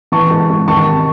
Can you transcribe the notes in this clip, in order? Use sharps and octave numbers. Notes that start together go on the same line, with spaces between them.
E3 A5 C#6
G#2
G#2
D#3 A5 C#6
C3